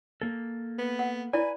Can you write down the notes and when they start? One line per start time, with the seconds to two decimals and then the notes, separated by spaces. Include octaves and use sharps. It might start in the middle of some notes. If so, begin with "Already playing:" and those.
0.22 A#3 A4
0.79 B3
0.99 F#5
1.33 E4 B4 D5 G#5